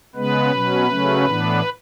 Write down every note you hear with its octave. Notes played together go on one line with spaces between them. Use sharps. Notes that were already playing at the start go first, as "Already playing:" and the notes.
C#3 G#3 B3 B4
B2 F#3 C#4
C#3 F#3 A3 C#4
A2 E3 B3 D4